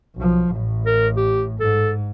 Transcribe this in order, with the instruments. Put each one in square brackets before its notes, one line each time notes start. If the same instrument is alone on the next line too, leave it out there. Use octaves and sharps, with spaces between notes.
[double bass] B1 F3
A1 A2
[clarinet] A#4
G4
[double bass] G#2 [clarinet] A4